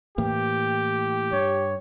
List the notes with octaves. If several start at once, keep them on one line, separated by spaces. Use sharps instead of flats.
A2 E3 A#3 G4
G2 C#5